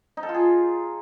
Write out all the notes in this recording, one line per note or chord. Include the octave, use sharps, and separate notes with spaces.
D#4
A4
F4
G#4